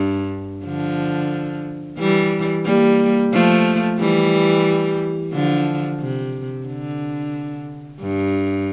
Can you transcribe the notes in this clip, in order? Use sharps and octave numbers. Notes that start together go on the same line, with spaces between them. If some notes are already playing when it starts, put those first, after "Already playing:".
Already playing: G2
D3 F3
E3 G3
G3 A#3
F3 A3
E3 G3
D3 F3
C3
D3
G2